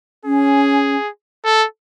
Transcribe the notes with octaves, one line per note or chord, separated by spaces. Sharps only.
C#4 G#4
A4